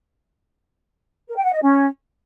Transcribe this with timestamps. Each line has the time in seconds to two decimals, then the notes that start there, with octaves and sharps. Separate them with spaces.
1.28 A#4
1.36 G5
1.45 F#5
1.53 D#5
1.62 C#4